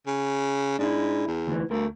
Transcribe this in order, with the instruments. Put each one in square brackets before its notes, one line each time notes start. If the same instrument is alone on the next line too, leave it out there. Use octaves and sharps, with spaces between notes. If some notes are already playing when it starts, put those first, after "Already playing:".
[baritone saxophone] C#3
[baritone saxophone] G#2 [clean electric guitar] D4 E4
[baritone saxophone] E2
[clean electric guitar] D2 E3
[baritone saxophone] D2 [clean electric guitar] A3 A#4